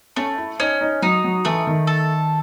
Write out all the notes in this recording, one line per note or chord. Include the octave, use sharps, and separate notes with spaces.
A3 C#4
E4
C#4 D#4
D#4
F#3 D#4
F#3
E3 A3
D#3
A4